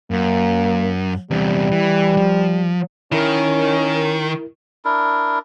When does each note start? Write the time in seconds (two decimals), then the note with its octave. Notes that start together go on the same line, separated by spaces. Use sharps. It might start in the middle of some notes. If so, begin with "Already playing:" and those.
0.11 F#2 A#3
1.31 E2 C3 G3
1.71 E3
2.17 F3
3.12 D#3 C#4 E4 A#4
4.85 D4 E4 A#4